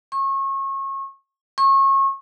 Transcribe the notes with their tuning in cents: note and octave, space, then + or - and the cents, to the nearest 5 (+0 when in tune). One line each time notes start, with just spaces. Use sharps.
C#6 -30
C#6 -30